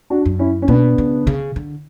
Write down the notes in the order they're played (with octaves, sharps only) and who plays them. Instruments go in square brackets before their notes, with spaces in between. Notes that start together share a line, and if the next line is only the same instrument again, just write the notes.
[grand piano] D4 F#4
[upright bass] F#2
[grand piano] C#4 E4
C#4
[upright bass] B2 [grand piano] B3 D4
[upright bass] C#3
C#3
D3